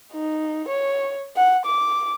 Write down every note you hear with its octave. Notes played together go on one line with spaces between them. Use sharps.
D#4
C#5
F#5
D6